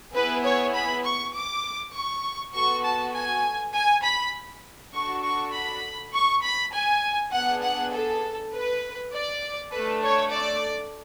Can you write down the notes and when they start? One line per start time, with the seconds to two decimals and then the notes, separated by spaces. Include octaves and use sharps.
0.15 B3 E4 G#4 B4
0.45 C#5
0.74 B5
1.05 C#6
1.35 D6
1.95 C#6
2.54 B3 F#4 A4 C#6
2.84 A5
3.14 G#5
3.74 G#5
4.04 B5
4.94 D4 F#4 A4 C#6
5.23 C#6
5.53 B5
6.13 C#6
6.43 B5
6.73 G#5
7.33 B3 D4 G#4 F#5
7.63 F#5
7.93 A4
8.52 B4
9.13 D5
9.72 A3 D4 A4 B4
10.03 C#5
10.31 D5